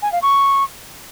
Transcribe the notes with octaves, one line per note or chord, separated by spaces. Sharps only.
G#5
F5
C#6